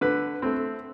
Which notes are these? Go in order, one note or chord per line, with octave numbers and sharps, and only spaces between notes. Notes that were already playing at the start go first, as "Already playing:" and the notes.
D3 B4
A3 C4